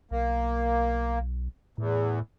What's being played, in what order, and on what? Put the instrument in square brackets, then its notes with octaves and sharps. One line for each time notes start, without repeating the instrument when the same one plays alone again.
[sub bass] B1 [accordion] A#3
[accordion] E2 [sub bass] A2